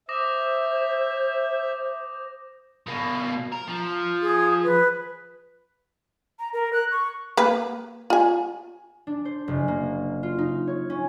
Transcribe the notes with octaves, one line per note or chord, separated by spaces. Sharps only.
C5 E5 D6 D#6 A#6
B2 A#3
A#4
F3
G#4
B4
A#5
A#4
F#6
C#6
A#3 B4
F4 G#5
D4
C5
F#1
A#3
F4
D#4
C#5
C#4